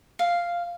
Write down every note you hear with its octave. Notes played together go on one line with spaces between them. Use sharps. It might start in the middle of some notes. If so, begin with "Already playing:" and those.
F5